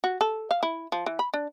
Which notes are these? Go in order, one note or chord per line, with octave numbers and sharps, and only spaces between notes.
F#4
A4
F5
E4
F3
E3
B5
D4